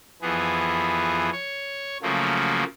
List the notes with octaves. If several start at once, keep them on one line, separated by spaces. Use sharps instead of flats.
F2 E3 B3 G#4
C#5
C#3 F3 F#3 A3 A#3